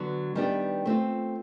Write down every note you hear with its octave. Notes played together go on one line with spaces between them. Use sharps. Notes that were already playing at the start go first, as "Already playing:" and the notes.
Already playing: D3 F#3 B3
D#3 G3 B3 D4 G4
A3 C4 F4